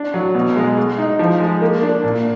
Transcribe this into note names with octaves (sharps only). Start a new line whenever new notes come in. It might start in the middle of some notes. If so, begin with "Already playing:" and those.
Already playing: D4
F#3
B2
G#3
G#3
D#4
F3
G#3
A#3
D4
A#2